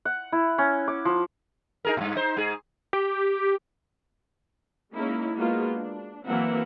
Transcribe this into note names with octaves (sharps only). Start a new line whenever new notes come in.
F#5
E4
C#4
D6
F3
D#4 G#4 A#4
G2 A#2
D#4 C5
G#2 G#4
G4
G#3 A#3 C#4 D#4 E4
G#3 A#3 B3 D#4 F4 F#4
D4
E3 F#3 A#3 C4 E5 F#5